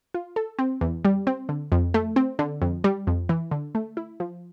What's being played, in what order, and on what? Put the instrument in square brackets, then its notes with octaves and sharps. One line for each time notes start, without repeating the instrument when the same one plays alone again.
[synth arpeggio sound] F4
A4
C4
E2
G3
C4
D3
F2
A3
C4
D3
F2
G3
F2
E3
D3
A3
E4
F3